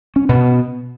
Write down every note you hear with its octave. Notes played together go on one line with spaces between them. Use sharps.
C#4
B2 B3